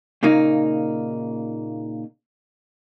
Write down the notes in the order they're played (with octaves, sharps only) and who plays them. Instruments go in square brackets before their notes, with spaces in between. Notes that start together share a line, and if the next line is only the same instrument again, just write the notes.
[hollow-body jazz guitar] A#2 C#3 A#3 D#4